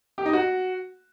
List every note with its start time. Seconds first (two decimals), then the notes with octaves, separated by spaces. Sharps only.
0.18 G4
0.26 D#4
0.33 F#4